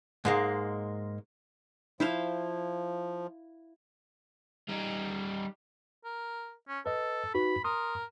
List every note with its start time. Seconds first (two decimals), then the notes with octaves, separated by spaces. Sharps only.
0.25 G#2 G#3 A#3
2.00 F3 E4 C5 F5
4.69 G3 D#4
6.05 A#4
6.69 C#4
6.86 A4 B4 D#5
7.34 D#4 F#4 B4 B5
7.64 A#4 C6 D#6